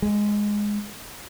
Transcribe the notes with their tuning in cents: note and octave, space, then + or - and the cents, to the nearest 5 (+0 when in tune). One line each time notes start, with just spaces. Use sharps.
G#3 -5